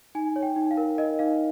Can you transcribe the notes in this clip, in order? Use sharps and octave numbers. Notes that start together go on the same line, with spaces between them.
D#4 G#5
C#5
G5
D#4
F5
A#4
A#4 D#5
D#4 F5